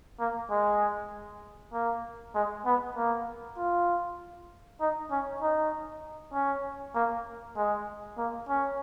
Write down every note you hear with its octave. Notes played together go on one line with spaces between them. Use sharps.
A#3
G#3
A#3
G#3
B3
A#3
F4
D#4
C#4
D#4
C#4
A#3
G#3
A#3
C#4